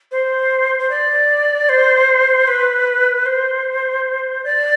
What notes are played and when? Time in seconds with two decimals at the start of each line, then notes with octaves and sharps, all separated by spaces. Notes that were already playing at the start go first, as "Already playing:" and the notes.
0.12 C5
0.79 C5
0.90 D5
1.69 C5
2.47 B4
3.26 C5
4.44 D5